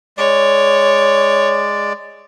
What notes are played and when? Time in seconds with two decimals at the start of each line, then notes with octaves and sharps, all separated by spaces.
0.18 G#3 C#5 D5